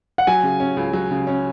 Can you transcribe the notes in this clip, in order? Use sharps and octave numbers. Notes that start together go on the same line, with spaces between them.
F#5
F#3 G#5
C#3
C#4
C#2
F#3
C#3
C#4